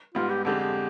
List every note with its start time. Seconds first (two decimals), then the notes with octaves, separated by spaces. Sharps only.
0.15 G#2 G3 B3 F4
0.30 G4
0.45 F2 D3 G#3 G4
0.60 G4